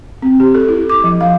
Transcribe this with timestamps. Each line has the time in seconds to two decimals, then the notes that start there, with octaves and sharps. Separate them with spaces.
0.22 C4
0.40 G4
0.55 A4
0.68 E4
0.89 D6
1.04 F3
1.21 F5